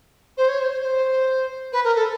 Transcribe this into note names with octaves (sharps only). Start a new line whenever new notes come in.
C5
C#5
C5
C5
C5
B4
A#4
A4